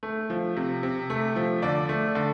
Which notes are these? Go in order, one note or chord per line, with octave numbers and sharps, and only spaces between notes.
A3
F3
C3
C3
A3
F3
D3 D5
A3
D3